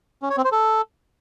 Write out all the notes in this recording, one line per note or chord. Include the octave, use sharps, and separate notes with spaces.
C#4
C#5
C4
C5
A4